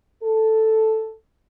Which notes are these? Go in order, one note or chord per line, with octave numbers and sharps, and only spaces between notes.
A4